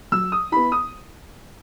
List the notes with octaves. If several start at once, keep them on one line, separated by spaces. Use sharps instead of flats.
F#3 E6
D#6
B3 E4 B5
D#6